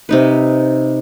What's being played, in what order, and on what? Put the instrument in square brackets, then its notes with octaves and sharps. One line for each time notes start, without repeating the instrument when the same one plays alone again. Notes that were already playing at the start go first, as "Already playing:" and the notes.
[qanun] C3 D#4 B4